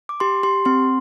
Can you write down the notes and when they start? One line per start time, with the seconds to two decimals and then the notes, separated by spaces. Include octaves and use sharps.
0.09 D6
0.20 G4 C6
0.43 G4 C6
0.65 C4 C6